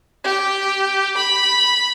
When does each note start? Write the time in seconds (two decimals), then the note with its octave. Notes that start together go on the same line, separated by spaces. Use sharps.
0.24 G4
1.17 B5